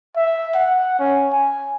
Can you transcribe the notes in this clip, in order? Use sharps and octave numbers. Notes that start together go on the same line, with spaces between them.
E5
F#5
C#4
G#5